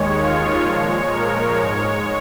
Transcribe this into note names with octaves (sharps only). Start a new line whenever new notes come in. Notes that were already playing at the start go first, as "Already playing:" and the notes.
Already playing: D#2 D#3 G#3 C#5
F4
A#2 F3 G#3 C#5
A#4
G#2 G#3 C#5